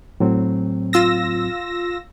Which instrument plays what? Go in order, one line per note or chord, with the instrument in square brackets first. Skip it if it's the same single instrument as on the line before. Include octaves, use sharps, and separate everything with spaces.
[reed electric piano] A2 F#3 C4
[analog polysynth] F4 E6 A#6